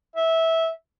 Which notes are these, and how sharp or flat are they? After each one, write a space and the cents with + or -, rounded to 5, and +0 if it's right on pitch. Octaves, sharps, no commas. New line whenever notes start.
E5 -15